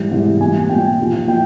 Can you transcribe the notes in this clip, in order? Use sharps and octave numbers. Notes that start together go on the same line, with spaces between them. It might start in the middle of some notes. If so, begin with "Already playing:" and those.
Already playing: G#2 E3 G3
G#2 E3 G3
A#2 G3 G#5
A#2 G3 G5
A#2 F3
A#2 F3 G5